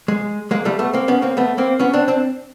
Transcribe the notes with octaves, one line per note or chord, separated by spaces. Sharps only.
G#3
G#3 A#3
G3 A3
A3 B3
A#3 C4
B3 C#4
A#3 C4
A3 B3
A#3 C4
B3 C#4
C4 D4
C4 D4